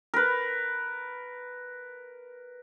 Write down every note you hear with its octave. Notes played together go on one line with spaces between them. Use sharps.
A#4 B4